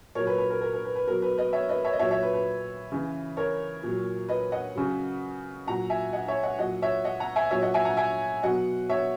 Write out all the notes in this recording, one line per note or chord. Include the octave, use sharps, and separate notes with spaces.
A#2 F#3 A#4 C#5
B4
B4
A#4
A#4
A#4
B4
B4
B2 F#3 A#4
B4
B4 D#5
C#5 E5
B4 D#5
C#5 E5
D#5
A#2 F#3 C#5 E5
C#5 E5
B4
B4
C#3 E3
A#4 C#5
A#2 F#3
B4 D#5
D#5 F#5
C#3 F#3
A#2 F#3 F#5 A#5
E5 G#5
D#5 F#5
C#5 E5
D#5 F#5
A#2 F#3 D#5 F#5
C#5 E5
D#5 F#5
F#5 A#5
E5 G#5
A#2 F#3 C#5 E5
D#5 F#5
E5 G#5
F#5 A#5
E5 G#5
B2 F#3 D#5 F#5
C#5 E5